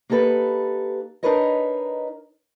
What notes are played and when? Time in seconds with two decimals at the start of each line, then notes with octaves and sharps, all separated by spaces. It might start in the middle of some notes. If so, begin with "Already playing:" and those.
0.10 A#3 D#4 G4 A4 B4
1.23 D4 D#4 A#4 B4 C#5 D#5